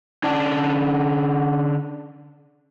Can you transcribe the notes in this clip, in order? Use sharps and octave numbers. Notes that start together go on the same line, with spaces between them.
D3 C#4 D5 A5